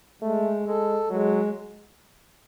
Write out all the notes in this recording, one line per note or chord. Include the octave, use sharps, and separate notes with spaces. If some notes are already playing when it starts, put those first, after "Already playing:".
G#3 A3
G#3 A4
F#3 G#3